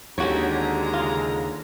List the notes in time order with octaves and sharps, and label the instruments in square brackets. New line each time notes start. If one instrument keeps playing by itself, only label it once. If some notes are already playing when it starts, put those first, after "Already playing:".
[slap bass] D#2 [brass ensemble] D3 G#3 A#5 [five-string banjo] C#4 F#4 C#5 [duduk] G4
[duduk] C#3 [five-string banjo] F4